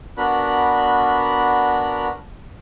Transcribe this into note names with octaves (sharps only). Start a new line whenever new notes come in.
B3 D4 F#4 A#4 B5 F#6